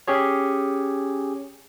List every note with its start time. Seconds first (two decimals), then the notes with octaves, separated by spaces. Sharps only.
0.08 C#4 G4 G#4 C#5